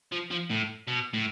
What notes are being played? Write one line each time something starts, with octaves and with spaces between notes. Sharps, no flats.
F3
F3
A2
B2
A2